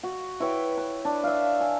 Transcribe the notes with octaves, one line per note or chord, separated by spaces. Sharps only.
F#4
E4 B4 C#5 G5
B4
D4
E5 F5
G#5